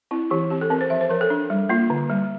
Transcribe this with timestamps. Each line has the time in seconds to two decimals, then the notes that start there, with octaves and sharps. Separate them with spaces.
0.11 C4 E4
0.30 E3 G4
0.50 C4 G4
0.61 A4
0.70 C4 A#4
0.81 C5
0.90 F3 E5
1.01 C5
1.10 F3 A#4
1.21 A4
1.30 D4
1.50 G3
1.69 A#3 F4
1.90 D3
2.09 G3